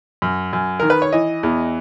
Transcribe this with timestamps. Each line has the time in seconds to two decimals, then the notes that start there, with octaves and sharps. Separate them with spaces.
0.22 F#2
0.53 F#2
0.80 D#3 A#4
0.90 B4
1.02 C#5
1.12 E3 D#5
1.43 E2